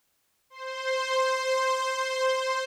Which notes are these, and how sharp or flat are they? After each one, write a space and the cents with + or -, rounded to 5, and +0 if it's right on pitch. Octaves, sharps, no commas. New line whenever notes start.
C5 +0 C6 +0